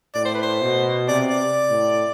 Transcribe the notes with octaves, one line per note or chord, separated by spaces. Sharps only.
A2 D5
C5
B4
C5
B2
C3 D5
D5
A2